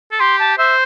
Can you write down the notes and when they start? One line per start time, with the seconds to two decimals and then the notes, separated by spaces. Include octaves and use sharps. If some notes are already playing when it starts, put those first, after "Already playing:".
0.12 A4
0.19 G4 C6
0.39 A5
0.58 C5 E5